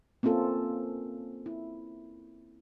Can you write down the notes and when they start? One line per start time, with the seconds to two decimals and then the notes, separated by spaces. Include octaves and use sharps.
0.23 A#3 C4 C#4 F4 A4
1.46 E4